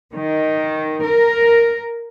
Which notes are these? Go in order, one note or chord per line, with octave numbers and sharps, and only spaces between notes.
D#3
A#4